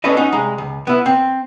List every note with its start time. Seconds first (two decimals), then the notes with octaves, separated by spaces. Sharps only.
0.04 A3 C#4 D4 A4 B4 D#5
0.17 C#4 D#4 F#4
0.32 C2 G#3 A#5
0.58 C#2
0.87 B3 E4
1.06 C4